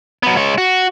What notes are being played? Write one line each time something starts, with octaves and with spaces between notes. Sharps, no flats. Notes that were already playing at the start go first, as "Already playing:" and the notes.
F#3 B3
G#3 C#5
F#4